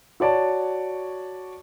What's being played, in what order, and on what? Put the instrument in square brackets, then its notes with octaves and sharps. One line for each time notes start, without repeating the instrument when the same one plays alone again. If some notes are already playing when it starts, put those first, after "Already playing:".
[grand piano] F#4 C#5 D5 A5